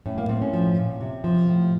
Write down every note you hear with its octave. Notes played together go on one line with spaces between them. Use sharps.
A2 C#4
A#3
A2 C4
C#4
F3
A#2
C3
F3
A2